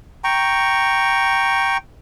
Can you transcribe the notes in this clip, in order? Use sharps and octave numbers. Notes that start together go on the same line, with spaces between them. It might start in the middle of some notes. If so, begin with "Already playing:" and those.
G5 A#5 C#6